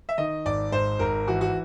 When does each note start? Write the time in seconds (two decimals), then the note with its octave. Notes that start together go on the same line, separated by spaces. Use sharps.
0.09 E5
0.18 D#3 D#5
0.45 G#1 D5
0.72 G#2 C5
0.99 G#1 A#4
1.28 E3 F#4
1.41 F#4